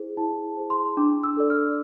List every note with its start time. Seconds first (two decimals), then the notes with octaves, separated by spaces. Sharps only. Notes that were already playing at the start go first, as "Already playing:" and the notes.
Already playing: E4 G#4 C5
0.17 E4 A5
0.57 G#4 C5
0.70 C6
0.97 D4 D6
1.24 E6
1.37 A4 D5
1.50 F6